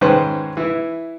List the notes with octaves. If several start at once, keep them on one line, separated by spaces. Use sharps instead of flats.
G#2 D#3 C#4 B4 C5
E3 E4